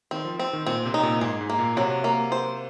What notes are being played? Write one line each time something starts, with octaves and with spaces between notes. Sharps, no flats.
D#3 C4
F3
C4
D#3
A#2 C4
C3
D#4
A#2
G#2 G#4
G#2
A#3
A#2
C3 F#3
A#3
C5